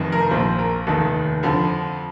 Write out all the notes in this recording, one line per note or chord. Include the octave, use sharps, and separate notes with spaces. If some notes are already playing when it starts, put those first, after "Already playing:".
Already playing: F1 F2 D#3
A#4
A#1 A#2 F3 C5
A#4
F1 D#2 D#3 A4
F2 D3 F3